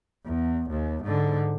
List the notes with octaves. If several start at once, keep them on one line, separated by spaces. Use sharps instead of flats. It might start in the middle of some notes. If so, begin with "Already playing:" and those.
E2
D#2
G#2 D3